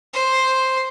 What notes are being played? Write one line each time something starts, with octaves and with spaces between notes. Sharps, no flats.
C5